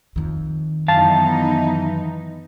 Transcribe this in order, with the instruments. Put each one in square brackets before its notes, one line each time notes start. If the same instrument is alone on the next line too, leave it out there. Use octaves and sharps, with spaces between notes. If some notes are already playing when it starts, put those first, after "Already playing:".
[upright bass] F2 D#3
[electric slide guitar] F#2 F5 A5 [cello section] E3 B3 D#4